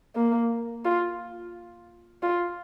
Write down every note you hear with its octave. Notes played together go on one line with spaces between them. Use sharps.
A#3
F4
F4